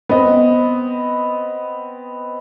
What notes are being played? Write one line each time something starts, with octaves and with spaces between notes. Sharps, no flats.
B3 C4 B4 D#5